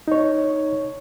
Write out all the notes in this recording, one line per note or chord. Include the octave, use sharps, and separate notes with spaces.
D#4 C#5